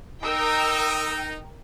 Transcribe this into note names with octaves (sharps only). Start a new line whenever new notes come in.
D#4 A#4 G5 E6